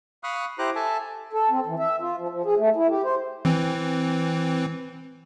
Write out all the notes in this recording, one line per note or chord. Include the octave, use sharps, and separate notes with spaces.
F5 B5 C#6 D#6 F6 F#6
E4 G4 C5 A#5 D6 F#6
A4 E5 G#5 A5
A4
C4
E3
E5
F4
F3
F3
G#4
A3
E4
G4
C5
E3 C4